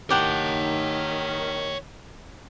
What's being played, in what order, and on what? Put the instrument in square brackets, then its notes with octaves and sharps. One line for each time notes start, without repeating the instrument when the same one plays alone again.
[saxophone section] D#3 [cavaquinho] G4 F#5 [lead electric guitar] C#5 A5